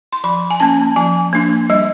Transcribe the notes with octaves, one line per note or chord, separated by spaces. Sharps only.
C6
F3 B5
G#5
A#3 C#4 A5
F3 G#5
A#3 D4
G3 D#5